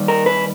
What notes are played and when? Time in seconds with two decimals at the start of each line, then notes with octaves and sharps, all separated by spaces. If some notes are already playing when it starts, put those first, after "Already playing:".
Already playing: D#2 D#3 G3
0.08 A#4
0.26 B4